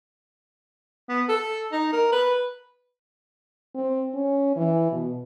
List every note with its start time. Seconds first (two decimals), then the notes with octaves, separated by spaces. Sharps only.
1.09 B3
1.29 A4
1.72 D#4
1.93 A#4
2.12 B4
3.75 C4
4.15 C#4
4.56 E3
4.92 B2